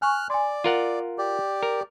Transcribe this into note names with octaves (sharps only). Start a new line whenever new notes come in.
G#5 C#6 F6 F#6
D5 G#5 C6
F4 A#4 F#5
G4 D5
A#4